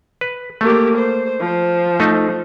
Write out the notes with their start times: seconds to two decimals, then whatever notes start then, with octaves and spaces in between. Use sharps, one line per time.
0.21 B4
0.61 A3 A#3 G4
0.98 C5
1.40 F3 C5
2.00 A3 D#4